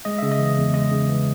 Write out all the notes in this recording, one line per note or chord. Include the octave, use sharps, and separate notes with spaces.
G#3 D#5
C#3 E5
D#5
E3
E2
G#3 D#5
C#3
E3